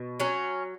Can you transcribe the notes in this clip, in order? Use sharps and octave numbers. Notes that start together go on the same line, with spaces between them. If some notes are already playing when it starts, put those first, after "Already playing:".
Already playing: B2
F#3 C#4